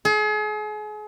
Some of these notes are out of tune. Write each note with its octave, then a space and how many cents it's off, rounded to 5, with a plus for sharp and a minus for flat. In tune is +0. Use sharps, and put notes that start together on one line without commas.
G#4 +35